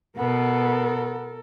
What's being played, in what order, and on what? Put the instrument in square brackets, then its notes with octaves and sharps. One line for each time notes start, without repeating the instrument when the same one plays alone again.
[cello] B2 [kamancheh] B3 [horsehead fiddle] A4 A#4